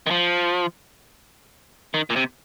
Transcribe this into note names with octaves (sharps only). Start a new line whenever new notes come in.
D#3
F3
D#3
A#2
C3